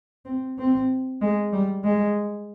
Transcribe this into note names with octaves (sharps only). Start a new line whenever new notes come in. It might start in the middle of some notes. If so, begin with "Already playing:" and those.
C4
C4
G#3
G3
G#3